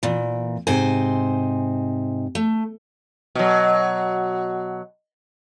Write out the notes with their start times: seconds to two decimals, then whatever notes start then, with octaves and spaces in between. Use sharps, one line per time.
0.03 A#2 E3
0.67 G#2 C3 D#4 C5 G#5
2.35 A3
3.35 B2 F#3